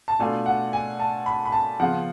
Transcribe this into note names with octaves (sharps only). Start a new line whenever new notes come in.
A5
B2 A3 D4 F4 G#5
F#5
G#5
A5
B5
B5
A5
C#3 F3 B3 F4 F#5